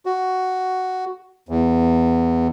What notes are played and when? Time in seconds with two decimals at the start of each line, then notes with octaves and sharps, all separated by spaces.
0.06 F#4
1.49 E2